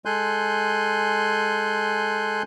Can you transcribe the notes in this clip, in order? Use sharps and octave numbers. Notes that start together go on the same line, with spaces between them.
G#3 A4 G#5 C6 F#6 G6